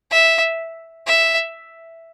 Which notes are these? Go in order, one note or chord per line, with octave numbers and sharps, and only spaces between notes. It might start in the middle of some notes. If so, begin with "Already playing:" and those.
E5
E5